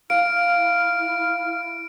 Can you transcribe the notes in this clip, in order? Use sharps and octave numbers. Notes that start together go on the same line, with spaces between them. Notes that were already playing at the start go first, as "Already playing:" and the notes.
E4 F5 F6 D7